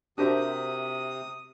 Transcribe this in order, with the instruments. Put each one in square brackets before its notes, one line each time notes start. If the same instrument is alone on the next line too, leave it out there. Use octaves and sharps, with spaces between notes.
[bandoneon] C3 [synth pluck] D4 G4 C5 [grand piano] F#4 A#4 E5 [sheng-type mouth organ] D#6